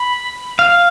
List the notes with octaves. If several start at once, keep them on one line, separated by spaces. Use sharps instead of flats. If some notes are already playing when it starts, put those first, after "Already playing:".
Already playing: B5
F5